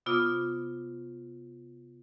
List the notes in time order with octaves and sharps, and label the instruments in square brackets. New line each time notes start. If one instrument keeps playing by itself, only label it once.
[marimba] C3 B3 F4 D6 D#6